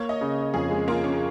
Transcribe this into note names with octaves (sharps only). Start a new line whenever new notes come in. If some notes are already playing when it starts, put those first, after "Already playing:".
Already playing: A#3 C#5
D#5
C#3
F2 G#4
G#3
A#3 F4
C#4